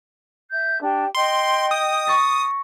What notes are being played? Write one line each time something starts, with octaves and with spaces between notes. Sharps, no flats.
E5 G6
D4 G4
D#5 G5 C6
D#6
C#6 A6 A#6